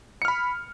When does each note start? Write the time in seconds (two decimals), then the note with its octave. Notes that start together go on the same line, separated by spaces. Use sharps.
0.22 C#7
0.25 F6
0.28 B5